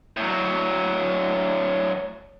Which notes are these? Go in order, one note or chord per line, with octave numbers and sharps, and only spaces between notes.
A2 F#3